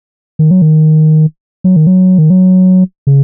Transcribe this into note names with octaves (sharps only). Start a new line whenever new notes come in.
D#3
F#3
D#3
F#3
D#3
F#3
D#3
F#3
C#3